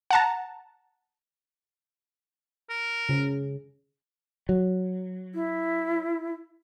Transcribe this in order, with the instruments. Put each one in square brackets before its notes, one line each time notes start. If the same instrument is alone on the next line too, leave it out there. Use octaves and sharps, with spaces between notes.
[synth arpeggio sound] F#5 A5 A#5
[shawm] A#4
[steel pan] C#3
[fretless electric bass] F#3
[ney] E4